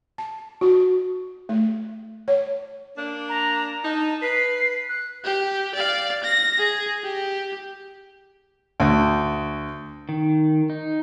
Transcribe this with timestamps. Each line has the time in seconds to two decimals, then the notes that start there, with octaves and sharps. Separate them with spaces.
0.18 A5
0.61 F#4
1.49 A3
2.28 C#5
2.97 A#3 D4
3.29 A#5
3.84 D#4 A5
4.22 B4 C7
4.89 F#6
5.24 G4
5.75 D5 F5
6.23 A#6
6.58 G#4
7.04 G4
8.80 D2
10.09 D#3
10.70 D#4